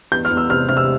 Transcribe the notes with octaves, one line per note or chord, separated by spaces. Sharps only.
E2 G6
F6
E2
E6
C3 F6
C3 F6
E6